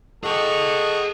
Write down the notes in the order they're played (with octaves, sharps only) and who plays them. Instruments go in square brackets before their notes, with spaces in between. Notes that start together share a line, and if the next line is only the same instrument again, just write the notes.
[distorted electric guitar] G#4 G5 [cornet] A4 [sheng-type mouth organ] D#5 F#5 C#6